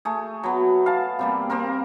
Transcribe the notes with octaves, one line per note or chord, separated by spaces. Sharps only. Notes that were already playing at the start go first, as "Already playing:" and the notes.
A3 G#4
F#3 B3
F5 A5
C3 G3 A#3
A#3 C4 A#4